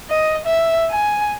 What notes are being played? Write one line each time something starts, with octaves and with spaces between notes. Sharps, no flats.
D#5
E5
G#5